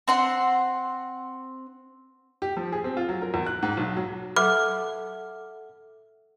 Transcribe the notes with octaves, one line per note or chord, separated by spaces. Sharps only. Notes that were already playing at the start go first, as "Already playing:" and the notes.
C4 F#5 C6
G4
F3
G#4
C4
F4
F#3
A#4
E2
F#6
G#2
B1
F#3
A4 E5 F#5 D6 F6